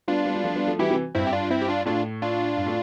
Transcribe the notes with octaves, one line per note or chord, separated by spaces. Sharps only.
G3 B3 D4 F4
G3 B3
G3
F3 A3
G3 B3
F3 A3
E3 G3 E4 G4
C3 E3
G2 C4 E4
G4
D4 F4
C4 E4
G4
D4 F4
A2 D4 F4
D4 F4
G2
A2